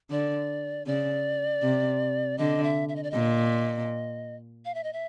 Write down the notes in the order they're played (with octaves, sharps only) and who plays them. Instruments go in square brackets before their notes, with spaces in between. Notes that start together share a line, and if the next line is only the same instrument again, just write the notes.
[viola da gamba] D3 [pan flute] D5
[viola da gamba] C#3 [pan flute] D5
[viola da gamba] C3
[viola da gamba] D3 [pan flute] D#5
[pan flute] E5
E5
D#5
D5
[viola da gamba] A#2 [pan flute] D#5
[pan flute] F5
E5
D#5
E5